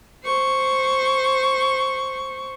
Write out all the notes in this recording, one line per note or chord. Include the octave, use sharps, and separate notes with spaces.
C5 C#6